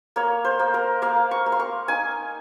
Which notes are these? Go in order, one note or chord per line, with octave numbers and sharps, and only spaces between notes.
A#3 C#5
C5
A#3
A#4
A#3 F5
C#6
A#3
C6
C#6
D#4 G#5